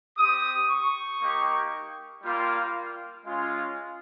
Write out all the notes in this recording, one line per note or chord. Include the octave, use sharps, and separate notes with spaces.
C4 G4 D#6
C#6
A#3 D#4 G4
G3 A#3 F4
G#3 C#4 F4